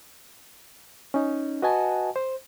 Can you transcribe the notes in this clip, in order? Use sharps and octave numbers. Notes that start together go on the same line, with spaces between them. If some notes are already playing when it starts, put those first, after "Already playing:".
C#4 D#4
F#4 B4 D#5 F#5 G#5 A5
C5